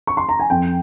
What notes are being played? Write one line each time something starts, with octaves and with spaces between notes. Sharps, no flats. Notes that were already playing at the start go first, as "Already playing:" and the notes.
C#6
C6
A#5
G#5
F2 G5